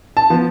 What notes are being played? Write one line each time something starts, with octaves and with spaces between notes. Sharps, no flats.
A5
F3 B3